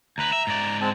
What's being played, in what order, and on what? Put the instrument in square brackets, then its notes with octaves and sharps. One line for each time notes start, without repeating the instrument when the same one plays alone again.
[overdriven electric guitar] D2 B4 [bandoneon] A#5
[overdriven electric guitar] E5
G#2 D5
[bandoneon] G#3 C4 A5